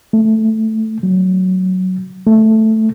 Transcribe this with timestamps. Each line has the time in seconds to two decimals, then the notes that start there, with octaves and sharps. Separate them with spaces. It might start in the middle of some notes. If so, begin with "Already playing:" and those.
0.13 A3
1.03 F#3
2.26 A3